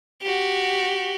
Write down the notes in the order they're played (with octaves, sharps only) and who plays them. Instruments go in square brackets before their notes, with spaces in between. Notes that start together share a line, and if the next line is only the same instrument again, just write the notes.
[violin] F#4 G4